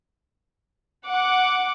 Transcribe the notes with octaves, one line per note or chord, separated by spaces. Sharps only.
F#5 D6